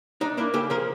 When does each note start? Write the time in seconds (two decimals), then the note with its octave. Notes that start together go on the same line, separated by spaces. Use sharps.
0.21 D4 D#4
0.37 A#3 D4 E4
0.54 C#3 G4 A4
0.70 F3 G#4 A#4